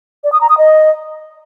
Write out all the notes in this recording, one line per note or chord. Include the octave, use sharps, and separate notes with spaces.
D5
D#6
A#5
D#6
D#5